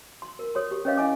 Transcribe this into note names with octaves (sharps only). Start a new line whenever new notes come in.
C6
A#4
A4 C#5 C6
G4
C#4 B4 C#5 D#5 F5 D6
E4 D#5 G#5 D6